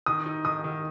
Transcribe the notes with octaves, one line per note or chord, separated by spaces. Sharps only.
D#3 D#6
D#4
D#3 D#6
D#3